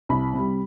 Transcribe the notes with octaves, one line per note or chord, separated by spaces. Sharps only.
C2 B5
C3 G3